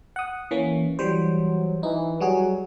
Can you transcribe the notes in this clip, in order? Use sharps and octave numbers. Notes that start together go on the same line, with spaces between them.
F#5 D#6
E3 A#3 C#4
E3 F#3 G3 C5
E3 D#4
F#3 G3 F#4 G#4